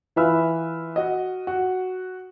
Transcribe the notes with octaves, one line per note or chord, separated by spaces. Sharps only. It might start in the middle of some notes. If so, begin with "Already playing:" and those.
E3 F4 B4 E5 B5 F6
F#4 D#5
F#4